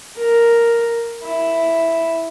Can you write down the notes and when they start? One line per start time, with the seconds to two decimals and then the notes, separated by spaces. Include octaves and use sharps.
0.18 A#4
1.24 E4